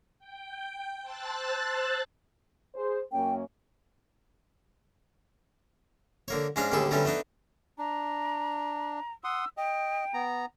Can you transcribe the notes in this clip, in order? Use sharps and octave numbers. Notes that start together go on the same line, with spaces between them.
G5
C5 A5 E6 F#6 A6
G#4 C5
F#2 A#3 C#4 G5
D3 A#3 C#5
G#2 C#4 D4 F5 A#5
A1 D#2 D3 G3 G#4 A4
D3 F#3 G3 A3 B3 C#4
A3 B3 D4 D#4
D4 A#5
F#5 C6 D#6 E6
D#5 G5
B3 A#5